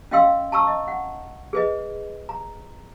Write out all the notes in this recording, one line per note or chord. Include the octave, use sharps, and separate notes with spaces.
C#4 D#5 F5 G5 C6 E6
A5 A#5 C#6 E6
D#5
F#5
G#4 B4 D#5
A#5